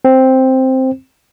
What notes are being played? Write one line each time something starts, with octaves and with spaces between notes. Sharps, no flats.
C4